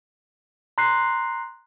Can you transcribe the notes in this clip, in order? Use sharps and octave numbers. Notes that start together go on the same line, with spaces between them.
A#5 C6 F#6 C7